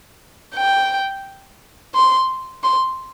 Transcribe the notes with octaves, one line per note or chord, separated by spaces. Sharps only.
G5
C6
C6